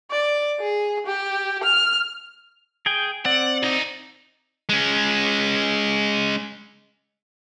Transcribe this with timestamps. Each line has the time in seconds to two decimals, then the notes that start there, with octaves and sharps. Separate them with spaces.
0.10 D5
0.60 G#4
1.06 G4
1.63 F6
2.86 G#4 G5
3.25 C4 D5 F#5
3.63 C2 D#4
4.69 G#3 C#4